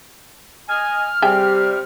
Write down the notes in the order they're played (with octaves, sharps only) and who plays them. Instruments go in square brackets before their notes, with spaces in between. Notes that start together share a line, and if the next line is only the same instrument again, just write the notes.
[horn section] D#5 G#5 [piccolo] F6
[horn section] C3 G3 [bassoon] G4 [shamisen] G#4 E5 G5